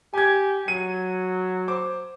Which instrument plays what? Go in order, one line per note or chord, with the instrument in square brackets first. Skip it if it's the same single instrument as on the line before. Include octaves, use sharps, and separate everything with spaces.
[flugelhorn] G4 [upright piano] G#5 G#6
[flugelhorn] F#3 [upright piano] D#7
[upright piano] C5 D6